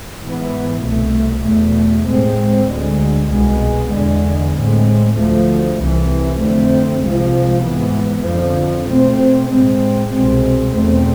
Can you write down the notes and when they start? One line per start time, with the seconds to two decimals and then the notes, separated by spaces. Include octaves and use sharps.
0.21 G#2 E3 B3
0.82 C2 B2 A3
1.44 E2 B2 A3
2.06 A2 G#3 C4
2.68 D2 D3 G#3
3.30 C2 B2 G#3 B3
3.91 E2 D3 G#3
4.54 A2 G#3 C4
5.15 D2 D3 F3 A3
5.78 C2 C3 E3
6.40 F2 D3 A3 C4
7.02 C2 C3 F3 G#3
7.64 G#2 E3 B3
8.25 F2 D3 F3
8.87 B2 A3 C4
9.50 A2 G#3 C4
10.11 C2 B2 G#3 C4
10.72 E2 B2 A3 C4